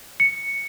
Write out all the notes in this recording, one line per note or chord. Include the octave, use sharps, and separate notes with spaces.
C#7